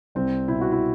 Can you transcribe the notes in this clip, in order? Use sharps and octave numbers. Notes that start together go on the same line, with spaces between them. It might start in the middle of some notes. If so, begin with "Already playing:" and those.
C2 C4
B2 E4
F#4
E4